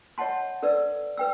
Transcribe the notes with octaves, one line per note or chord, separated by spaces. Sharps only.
C#5 D#5 F#5 A5 C6
A4 B4 D5 E6
B4 G5 E6